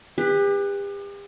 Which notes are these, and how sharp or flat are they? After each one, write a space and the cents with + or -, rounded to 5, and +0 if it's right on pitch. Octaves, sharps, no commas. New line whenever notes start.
G4 +40 B4 +0